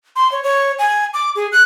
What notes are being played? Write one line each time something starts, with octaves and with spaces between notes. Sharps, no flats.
C6
C#5
C#5
G#5
D6
G#4
F#6